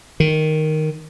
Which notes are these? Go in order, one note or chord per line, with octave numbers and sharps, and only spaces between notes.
D#3